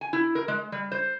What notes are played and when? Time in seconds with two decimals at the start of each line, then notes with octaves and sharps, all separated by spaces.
0.01 G#5
0.13 E4
0.35 A#4
0.48 G#3
0.72 G3
0.91 C5